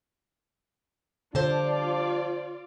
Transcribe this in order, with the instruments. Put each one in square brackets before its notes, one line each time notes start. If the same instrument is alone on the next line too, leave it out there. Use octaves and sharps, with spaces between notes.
[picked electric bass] D3 [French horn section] F3 G3 D4 [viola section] F4 D5 [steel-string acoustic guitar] C5 A5